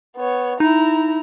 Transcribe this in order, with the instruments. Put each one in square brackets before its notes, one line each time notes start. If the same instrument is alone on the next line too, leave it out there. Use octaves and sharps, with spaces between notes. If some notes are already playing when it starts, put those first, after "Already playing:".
[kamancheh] B3 C#5
[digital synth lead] D#4 [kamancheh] E4 A#5